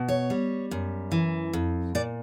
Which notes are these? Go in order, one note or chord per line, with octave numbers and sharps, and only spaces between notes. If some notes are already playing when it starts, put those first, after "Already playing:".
Already playing: B2
C#5
G3
F#2
E3
F2
A#2 D5